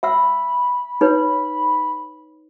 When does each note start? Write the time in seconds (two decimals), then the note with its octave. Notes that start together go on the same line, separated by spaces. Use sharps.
0.03 E5 F#5 B5 E6
1.01 D#4 B4 C#5